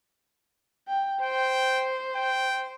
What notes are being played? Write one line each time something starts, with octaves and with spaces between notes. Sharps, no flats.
G5
C5 G5
G5